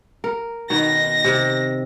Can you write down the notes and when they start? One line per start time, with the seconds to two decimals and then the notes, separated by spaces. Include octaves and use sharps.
0.24 A#4
0.70 B2 D#3 A#6
1.24 C3